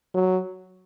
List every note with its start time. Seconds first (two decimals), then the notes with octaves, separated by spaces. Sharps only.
0.14 F#3